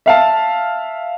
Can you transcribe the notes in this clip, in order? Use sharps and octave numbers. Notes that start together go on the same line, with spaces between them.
E5 F5 A5